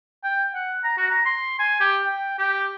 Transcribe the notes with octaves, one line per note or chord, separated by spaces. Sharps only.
G5
F#5
A#5
F#4
A#5
C6
G#5
G4
G5
G4